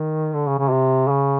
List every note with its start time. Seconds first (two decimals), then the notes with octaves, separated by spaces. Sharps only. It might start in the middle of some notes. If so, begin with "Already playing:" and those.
Already playing: D#3
0.34 D3
0.47 C#3
0.59 C#3
0.71 C3
1.08 C#3